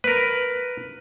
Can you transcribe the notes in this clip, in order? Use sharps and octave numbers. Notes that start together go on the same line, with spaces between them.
A#4 B4